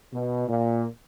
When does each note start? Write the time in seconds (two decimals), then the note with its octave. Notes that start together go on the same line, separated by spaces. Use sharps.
0.12 B2
0.48 A#2